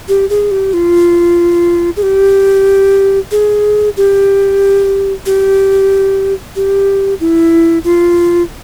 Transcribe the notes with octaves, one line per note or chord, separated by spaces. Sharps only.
G4
G#4
G4
F4
G#4
G4
G#4
G4
G4
G4
E4
F4